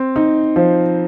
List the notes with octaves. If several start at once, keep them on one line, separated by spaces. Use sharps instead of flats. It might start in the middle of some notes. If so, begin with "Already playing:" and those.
Already playing: C4
D#4
F3